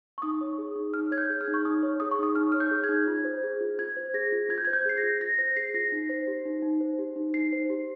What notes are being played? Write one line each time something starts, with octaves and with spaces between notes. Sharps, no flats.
C#6
D#4 D#6
C#5
G#4
D#4
D#4 F6
C#5 G#6
G6
G#4
F6
D#4
C#6
D#4 D#6
C#5
G#4 D#6
C#6
D#4 D#6
D#4 F6
C#5 F6
G6
G#4
G#6
D#4
F4
C5
G#4
F4
F4 G#6
C5
G#4 A#6
F4
F4 G#6
G6
C5 G#6
G6
G#4 C7
A#6
F4
F4 A#6
C5 A#6
G#4 C7
F4 A#6
D#4
C5
G4
D#4
D#4
C5
G4
D#4
D#4 C7
C5
G4